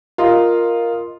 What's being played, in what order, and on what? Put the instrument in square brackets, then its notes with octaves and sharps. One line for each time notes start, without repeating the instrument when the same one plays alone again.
[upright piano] F4 [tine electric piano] A#4 D#5 C6